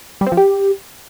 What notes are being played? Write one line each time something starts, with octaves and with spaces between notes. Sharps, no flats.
G3
C4
F3
G4